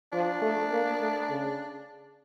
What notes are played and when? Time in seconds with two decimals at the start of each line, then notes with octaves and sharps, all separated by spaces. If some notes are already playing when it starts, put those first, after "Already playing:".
0.12 F3 D4
0.42 A3
0.72 A#3
1.00 A3
1.30 C#3